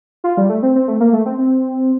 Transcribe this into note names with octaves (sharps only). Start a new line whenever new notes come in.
F4
G3
A3
C4
C4
A3
A#3
A3
C4
C4